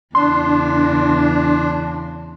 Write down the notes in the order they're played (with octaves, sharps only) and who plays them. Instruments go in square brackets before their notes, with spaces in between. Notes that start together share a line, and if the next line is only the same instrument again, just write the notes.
[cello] E2 C#3 [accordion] D4 [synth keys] C6